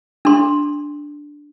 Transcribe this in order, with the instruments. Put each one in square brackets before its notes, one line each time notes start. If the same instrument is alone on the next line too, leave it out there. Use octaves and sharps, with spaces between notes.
[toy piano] D4 C6